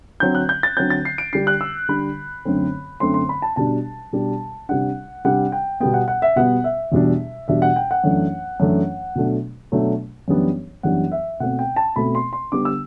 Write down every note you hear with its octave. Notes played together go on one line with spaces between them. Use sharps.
D3 F#3 C4 G6
F#6
G6
A6
D3 F#3 C4 G6
A6
C7
D7
D3 G3 D4 C7
F#6
E6
D3 G3 D4 B5
F#2 D3 A3 C4
F#2 D3 A3 C4 C6
C6
B5
A5
B2 G3 D4 A5
B2 G3 D4
C3 G3 D4 F#5
C3 G3 D4 F#5
G5
B2 G3 B3 G5
F#5
F#5
E5
B2 G3 B3 F#5
E5
E2 B2 G3 D4
E2 B2 G3 D4 E5
F#5
G5
F#5
F#2 E3 A3 D4
F#2 E3 A3 D4
B2 F#3 A3 D4
B2 F#3 A3 D4
F#2 E3 G3 B3 D4
F#2 E3 G3 B3 D4 F#5
E5
B2 A3 C4 F#5
G5
A5
B2 A3 C4 B5
C6
C6
D3 G3 B3 D4 D6
E6